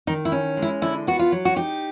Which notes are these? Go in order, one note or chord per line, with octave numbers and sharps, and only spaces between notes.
D#3 D#4
E4
C#4
G#3
E4
D3 E4
B3 F#4
F4
F#3
F#4
D#4 G4